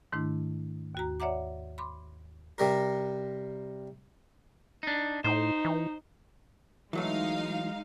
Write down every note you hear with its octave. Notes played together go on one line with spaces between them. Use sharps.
G#2 D#3 A3 D4 E4
D#2 F#4 A#5
C#5 D5 E5 F#5 A#5 D6
B5 C6 D6
C3 G3 A#4
D4 D#4
A2 D#4 C5
E3
E3 F#3 G#3 A3 D#4 F5